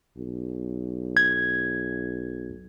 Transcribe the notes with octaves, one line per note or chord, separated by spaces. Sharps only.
B1
G#6